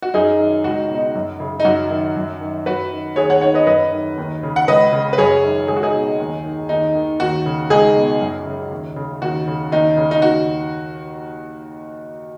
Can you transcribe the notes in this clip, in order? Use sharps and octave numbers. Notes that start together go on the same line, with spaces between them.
F#4
F#2 D#4 G#4
D#3
C#2 F#4
D#4
B2 D#4
F#2
C#3
D#4
F#2 F#4
D#3
F#2
D#3
F#2 F#4 B4
D#3
D#2 G#4 C#5
C#5 F#5
D#3 C#5 F#5
B4 D#5
F#2 B4 D#5
D#3
D#2
C#3
F#5
C#2 B4 D#5
C#3
B4
F#2 G#4 C#5
D#3
C#2 G#4
F#4
D#4 G#4
B2
D#2
D#3
D#2 D#4
D#3
D#2 F#4
C#3
C#2 D#4 G#4
B2
F#2
C#3
D#2
C#3
D#2 F#4
C#3
D#2 D#4
C#3
D#4
D#2 F#4